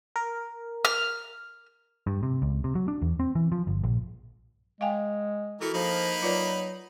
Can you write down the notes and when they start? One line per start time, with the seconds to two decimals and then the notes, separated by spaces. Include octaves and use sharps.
0.16 A#4
0.85 F6
2.07 G2
2.23 C3
2.42 C#2
2.64 C3
2.75 F#3
2.88 D4
3.02 E2
3.20 C4
3.35 E3
3.52 F3
3.67 G1
3.84 A#1
4.81 G#3 F5 G5 G#5
5.61 E3 E4 F#4 A4 A#4
5.74 F3 A#3 D#4 B5
6.22 F#3 F4 B4 D5